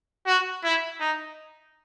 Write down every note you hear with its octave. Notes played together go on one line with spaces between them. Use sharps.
F#4
E4
D#4